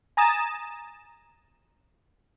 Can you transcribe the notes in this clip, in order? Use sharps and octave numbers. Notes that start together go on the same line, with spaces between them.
G#5 A#5 D#6 A6 E7